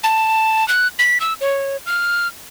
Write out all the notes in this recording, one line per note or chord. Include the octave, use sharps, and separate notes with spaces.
A5
F#6
B6
E6
C#5
F6